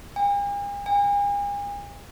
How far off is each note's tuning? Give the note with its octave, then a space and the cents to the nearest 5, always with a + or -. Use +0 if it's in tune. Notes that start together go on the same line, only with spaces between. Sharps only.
G#5 -45
G#5 -40